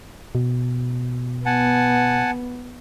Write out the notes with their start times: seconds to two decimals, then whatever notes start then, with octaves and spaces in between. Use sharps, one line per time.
0.35 B2
1.46 B3 F#5 G#5 A5